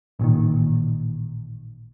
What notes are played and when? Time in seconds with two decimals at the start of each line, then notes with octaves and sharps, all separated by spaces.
0.19 A1 A#2 D#3